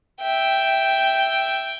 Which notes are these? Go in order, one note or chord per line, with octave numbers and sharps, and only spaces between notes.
E5 G5